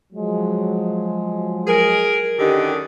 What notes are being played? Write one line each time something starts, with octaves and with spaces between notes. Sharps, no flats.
F3 F#3 G#3
G#4 A#4
F#2 D3 D#3 G4